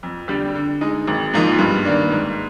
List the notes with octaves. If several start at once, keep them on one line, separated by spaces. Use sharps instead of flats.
F2
D3 G3 D4 G4
D3
G#3 D#4
G#1
G#2 F3 A#3 D#4
G2
D#3 A#3 D4
G#2